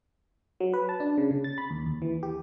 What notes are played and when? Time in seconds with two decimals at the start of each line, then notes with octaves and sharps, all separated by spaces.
0.60 F#3
0.74 B4
0.89 A5
1.00 D4
1.18 C#3
1.31 C#3
1.44 A6
1.58 B5
1.71 D#2
1.86 D#2
2.02 E3
2.23 G4